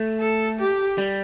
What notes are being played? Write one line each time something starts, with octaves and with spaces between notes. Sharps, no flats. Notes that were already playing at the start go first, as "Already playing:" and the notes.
Already playing: A3
A4
G4
G3